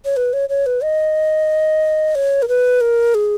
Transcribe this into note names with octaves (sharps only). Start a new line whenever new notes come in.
C#5
B4
C#5
C#5
B4
D#5
C#5
A#4
B4
A#4
G#4